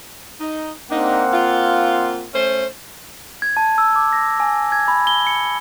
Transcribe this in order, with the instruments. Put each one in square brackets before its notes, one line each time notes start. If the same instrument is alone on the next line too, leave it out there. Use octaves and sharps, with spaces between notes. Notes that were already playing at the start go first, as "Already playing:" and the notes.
[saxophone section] D#4
[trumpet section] A#3 C4 F#5 [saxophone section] D4 D#4
[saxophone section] F4
A3 C#4 C5
[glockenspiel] G#6
A5
E6
D6
A#6
G#5
G#6
B5
G7
C#7